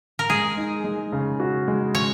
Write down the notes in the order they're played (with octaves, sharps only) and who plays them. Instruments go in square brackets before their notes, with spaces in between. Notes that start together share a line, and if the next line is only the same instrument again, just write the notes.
[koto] A#4
[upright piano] G#3 [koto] G#4
[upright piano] D#4
G#3
C#3
F#4
G#3
[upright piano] C#3 [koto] C#5